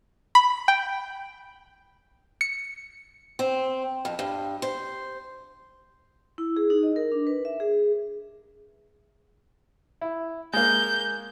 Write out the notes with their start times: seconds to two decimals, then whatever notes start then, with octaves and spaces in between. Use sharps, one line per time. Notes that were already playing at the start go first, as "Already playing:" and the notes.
0.35 B5
0.68 G5
2.41 C#7
3.39 C4
4.05 F2
4.19 G2
4.62 C5
6.38 E4
6.57 G#4
6.70 D#4
6.83 D#5
6.96 A#4
7.12 D4
7.27 B4
7.45 E5
7.60 G#4
10.01 E4
10.53 G#3 A#3 G6